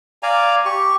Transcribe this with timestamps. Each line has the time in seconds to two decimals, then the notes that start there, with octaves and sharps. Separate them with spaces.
0.23 D5 F5 G#5 A#5
0.65 G4 C#6